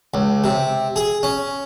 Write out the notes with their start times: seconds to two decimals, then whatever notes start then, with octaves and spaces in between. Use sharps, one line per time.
0.14 C#2
0.44 C3
0.96 G#4
1.23 C#4